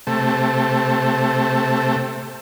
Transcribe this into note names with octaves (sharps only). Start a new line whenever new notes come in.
C3 A3